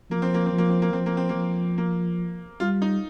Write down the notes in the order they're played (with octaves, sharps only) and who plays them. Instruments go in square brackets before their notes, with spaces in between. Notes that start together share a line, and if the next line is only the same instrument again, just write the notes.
[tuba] F3 [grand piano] A#3
[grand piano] C4
A#3
C4
[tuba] F3
[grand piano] A#3
C4
A#3
[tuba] F3 [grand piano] C4
[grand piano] A#3
C4
A#3
[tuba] F3
[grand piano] A#3
[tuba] G3 [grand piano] F4
[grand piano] D#4